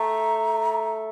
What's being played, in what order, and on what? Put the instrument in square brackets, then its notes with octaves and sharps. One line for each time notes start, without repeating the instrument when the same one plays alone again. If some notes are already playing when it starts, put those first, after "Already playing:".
Already playing: [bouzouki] A3 [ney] A#5